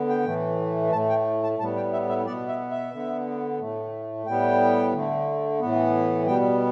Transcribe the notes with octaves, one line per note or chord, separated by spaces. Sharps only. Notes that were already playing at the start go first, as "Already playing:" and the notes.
Already playing: D3 B3
G5
A2 E3 A3
A2 A3 A5
G5
A5
A2 G3 B3 A5
G5
E5
E5
B2 B3 D5
E5
E5
D3 B3
A2 A3
A2 G3 B3 G5
D3 A3
A2 E3 B3
B2 G3 B3 G5